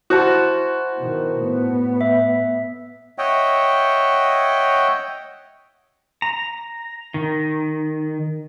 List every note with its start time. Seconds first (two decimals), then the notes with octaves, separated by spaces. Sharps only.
0.10 E4 F#4 C5 A5
0.98 B2 D#3
1.41 A2 B3
2.01 E5
3.18 C#5 D#5 E5 F#5 G5
6.22 A#5
7.14 D#3